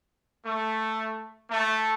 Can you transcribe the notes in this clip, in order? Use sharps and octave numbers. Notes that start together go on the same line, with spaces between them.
A3
A3